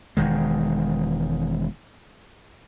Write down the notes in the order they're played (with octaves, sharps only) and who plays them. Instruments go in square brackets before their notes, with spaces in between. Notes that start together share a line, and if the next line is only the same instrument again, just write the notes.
[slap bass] E1 D#3 G#3